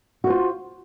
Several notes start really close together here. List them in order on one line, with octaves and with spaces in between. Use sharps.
F#4 C5 F4